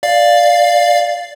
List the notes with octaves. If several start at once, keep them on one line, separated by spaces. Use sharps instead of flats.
D5 F5